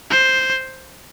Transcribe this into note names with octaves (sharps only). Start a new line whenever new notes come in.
C5